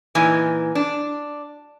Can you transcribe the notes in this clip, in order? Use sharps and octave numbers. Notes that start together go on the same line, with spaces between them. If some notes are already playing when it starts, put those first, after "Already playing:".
A#2 E3 D#4 G#5
D4